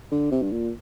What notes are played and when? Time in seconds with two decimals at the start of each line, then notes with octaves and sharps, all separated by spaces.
0.11 D3
0.31 C3
0.42 G2
0.52 A#2